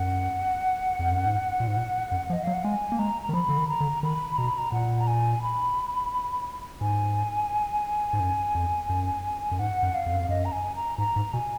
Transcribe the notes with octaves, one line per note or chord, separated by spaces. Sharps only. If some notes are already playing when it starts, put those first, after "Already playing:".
Already playing: F#2 F#5
F2
F#2
G#2
A#2
G#2
A#2
F#2
F3
D#5
F#3 F5
F#5
G#3 G#5
A#3
G#3 A#5
A#5
D#3
F3 B5
D3
D#3
A#5
D3
D#3 B5
B2 A#5
B5
A#5
A#2 F#5
A#5
G#5
B5
G#2 G#5
G#2
F#2
F2
F#2
F#2
G#2 F#5
F#2
F5
F2
F#2
F2
F#2 D#5
A#5
G#5
A#5
G#2 A#5
G#2
B2 G#5